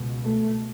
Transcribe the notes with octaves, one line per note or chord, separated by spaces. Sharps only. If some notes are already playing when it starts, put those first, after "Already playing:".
Already playing: C#2 B2
A3